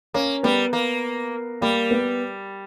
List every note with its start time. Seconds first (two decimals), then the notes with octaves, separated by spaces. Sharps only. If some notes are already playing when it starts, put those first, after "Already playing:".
0.14 A#3 C#4
0.43 G3 B3
0.73 A#3
1.61 G3 A#3
1.91 B3